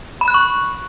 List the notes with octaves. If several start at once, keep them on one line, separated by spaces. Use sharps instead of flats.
B5
F#6
C#6